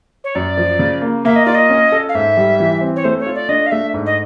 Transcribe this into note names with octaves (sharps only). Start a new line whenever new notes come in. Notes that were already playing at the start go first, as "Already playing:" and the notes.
C#5
F#2 D5
F3
C#3
A#3
A#3 E5
D#5
F4 D5
D#5
C#4
A4
F5
G#2 E5
G3
E3
C4
C#5
A3 C5
C#5
F4
D5
D4 D#5
F5
A3 E5
G#2
D#5